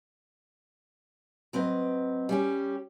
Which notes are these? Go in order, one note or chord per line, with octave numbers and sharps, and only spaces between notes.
F#3 C4 B4 D#5
G3 C#4 G4